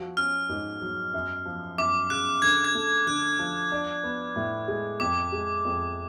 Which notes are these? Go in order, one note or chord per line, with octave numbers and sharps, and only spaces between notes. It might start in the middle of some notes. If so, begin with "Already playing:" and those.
Already playing: F3 F#4
C#4 F6
G#2
F#3
F#2
F3
F#2 D6
C#3 F#6
D3 G#6
G#6
A3
D3 F#6
F3
D4
B3
A2
G#3
F2 D6
G#3
F2